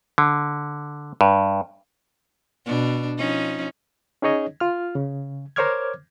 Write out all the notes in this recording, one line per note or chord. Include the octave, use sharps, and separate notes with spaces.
D3
G2
B2 D4
F3 C#4 D#4
C#4 D#4 G#4 C#5 D#5
F4 F6
C#3
A#4 C5 C#5 D6 F6 G#6